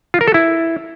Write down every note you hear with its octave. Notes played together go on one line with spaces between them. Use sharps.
F4
A#4
A4
E4